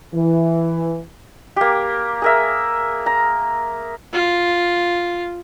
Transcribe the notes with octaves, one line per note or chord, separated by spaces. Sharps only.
E3
A#3 G4
G#4 A#4 E5
A#5
F4